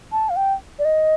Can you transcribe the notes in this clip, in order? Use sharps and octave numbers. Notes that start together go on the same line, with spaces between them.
A5
F5
G5
D5
D#5